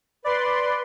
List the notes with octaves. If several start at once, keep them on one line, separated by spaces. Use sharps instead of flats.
B4 D5 C6